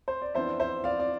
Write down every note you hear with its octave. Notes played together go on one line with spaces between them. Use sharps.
C5
D5
F2 E3 B3 D4 C5 E5
C5 E5
D5 F5
D5